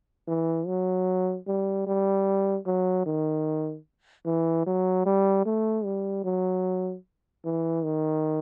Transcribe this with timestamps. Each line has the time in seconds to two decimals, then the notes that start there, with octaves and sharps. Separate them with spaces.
0.28 E3
0.67 F#3
1.48 G3
1.87 G3
2.66 F#3
3.06 D#3
4.26 E3
4.66 F#3
5.06 G3
5.46 A3
5.85 G3
6.25 F#3
7.45 E3
7.84 D#3